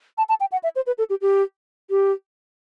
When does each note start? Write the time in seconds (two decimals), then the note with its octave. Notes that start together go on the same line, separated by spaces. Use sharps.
0.18 A5
0.29 A5
0.40 G5
0.52 F#5
0.63 E5
0.76 C5
0.87 B4
0.98 A4
1.10 G4
1.22 G4
1.90 G4